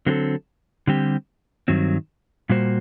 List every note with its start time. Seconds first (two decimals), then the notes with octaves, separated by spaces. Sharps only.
0.06 D3 F#3 C4 F#4 A4
0.87 D3 G3 C4 G4
1.68 G2 D#3 F#3 C4
2.49 A#2 G3 A#3 F#4 C5